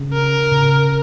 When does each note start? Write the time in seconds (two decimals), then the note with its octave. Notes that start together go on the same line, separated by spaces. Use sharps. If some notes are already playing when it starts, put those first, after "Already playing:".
Already playing: C#3
0.13 A#4
0.52 C#3